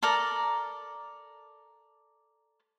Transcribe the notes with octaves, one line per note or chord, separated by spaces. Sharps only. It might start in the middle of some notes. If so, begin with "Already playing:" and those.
A4 A#4 D5 A#5